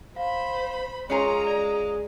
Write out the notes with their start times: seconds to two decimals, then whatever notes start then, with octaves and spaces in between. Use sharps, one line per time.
0.16 C5 F5 B5
1.10 G#3 C#4 F4 A#4 C#5 G#5 A#5 C6
1.47 D5